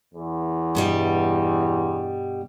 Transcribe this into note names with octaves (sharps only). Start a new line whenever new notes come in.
E2
G2 B2 G3